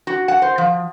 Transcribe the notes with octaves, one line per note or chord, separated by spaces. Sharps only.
F#4
F#5
C5
F3